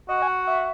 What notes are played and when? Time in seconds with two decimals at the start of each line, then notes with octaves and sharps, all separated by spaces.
0.09 F#4 D#5
0.22 G#5
0.28 F#5
0.47 E5